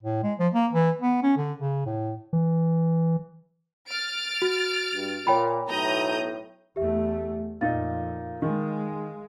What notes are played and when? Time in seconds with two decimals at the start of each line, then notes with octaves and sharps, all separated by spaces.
0.03 A2
0.23 G#3
0.39 F3
0.53 A#3
0.73 E3
1.02 B3
1.23 C#4
1.37 D3
1.59 C#3
1.86 A2
2.33 E3
3.87 F6 A6 D7
4.42 F#4
4.95 G2
5.27 A#2 C#5 G5 B5
5.68 B1 A2 A#5 D#6 G6
6.76 E2 A3 G4 E5
7.61 F2 A#2 D#4 F5 A6
8.42 D#3 G#3